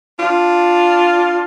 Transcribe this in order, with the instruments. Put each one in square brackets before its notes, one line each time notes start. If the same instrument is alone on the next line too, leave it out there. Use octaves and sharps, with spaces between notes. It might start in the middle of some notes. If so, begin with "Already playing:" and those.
[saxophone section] D4 F4